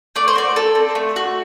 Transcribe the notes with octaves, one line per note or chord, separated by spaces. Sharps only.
A3 D5
C5
F#4 D5
A4
C4
A3
F#4